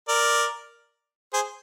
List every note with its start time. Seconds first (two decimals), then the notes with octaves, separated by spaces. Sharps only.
0.08 A#4 D5
1.33 G#4 C5